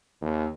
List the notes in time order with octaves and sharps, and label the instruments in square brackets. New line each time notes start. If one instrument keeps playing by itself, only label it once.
[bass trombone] D#2